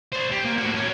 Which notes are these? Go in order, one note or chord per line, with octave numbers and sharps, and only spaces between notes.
C5 D5
G4
A#3
A2 F#4
C#4 A#4